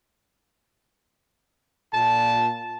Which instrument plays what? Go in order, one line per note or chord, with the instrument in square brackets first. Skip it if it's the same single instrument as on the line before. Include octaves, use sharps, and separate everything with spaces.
[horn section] A#2 A5